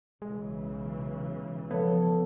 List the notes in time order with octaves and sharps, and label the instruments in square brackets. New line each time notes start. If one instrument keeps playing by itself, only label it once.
[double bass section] B1 C#3 E3 [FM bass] G#3
[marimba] F3 C#5 [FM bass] B3 [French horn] A4